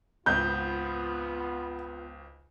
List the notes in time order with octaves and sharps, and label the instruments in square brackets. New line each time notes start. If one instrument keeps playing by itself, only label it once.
[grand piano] G#1 C#2 [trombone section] B3 F4 [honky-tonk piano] G6